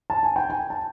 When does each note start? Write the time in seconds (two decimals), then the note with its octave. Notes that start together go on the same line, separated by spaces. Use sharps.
0.10 A5
0.23 G#5
0.36 G5
0.50 G#5
0.70 A5